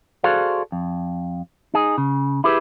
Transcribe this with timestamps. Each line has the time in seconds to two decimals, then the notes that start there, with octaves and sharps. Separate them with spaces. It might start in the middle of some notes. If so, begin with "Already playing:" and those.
0.24 F#4 G#4 A4 C5 D5 F5
0.72 F2
1.74 D#4 G#4
1.98 C#3
2.44 E4 G4 G#4 B4